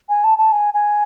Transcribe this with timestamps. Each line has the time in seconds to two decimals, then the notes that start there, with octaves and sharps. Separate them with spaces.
0.09 G#5
0.24 A5
0.38 A5
0.52 G#5
0.74 G#5